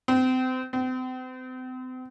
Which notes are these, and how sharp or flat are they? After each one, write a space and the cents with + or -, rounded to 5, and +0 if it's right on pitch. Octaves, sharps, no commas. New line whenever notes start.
C4 -30
C4 -40